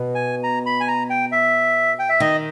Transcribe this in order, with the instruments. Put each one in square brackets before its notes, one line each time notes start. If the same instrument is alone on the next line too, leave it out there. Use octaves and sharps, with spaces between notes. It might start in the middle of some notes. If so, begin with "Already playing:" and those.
Already playing: [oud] B2
[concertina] G#5
A#5
B5
G#5
A#5
G5
E5
G5
E5
[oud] D#3 [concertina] D#5